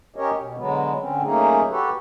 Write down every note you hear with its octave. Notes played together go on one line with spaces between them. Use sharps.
C#4 G4 A#4 C#5 D#5
B2
D3 F#3 G#3 B3
D3 C4 C#4
F#3 A3 A#3 C#4 D#4 G#4
F#4 G4 A4 B4